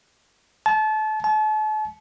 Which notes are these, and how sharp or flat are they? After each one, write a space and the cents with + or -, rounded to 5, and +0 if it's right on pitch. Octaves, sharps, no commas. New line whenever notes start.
A5 -30
A5 -40